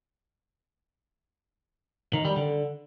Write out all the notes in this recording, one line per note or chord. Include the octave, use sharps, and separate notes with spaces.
D#3
G3
D3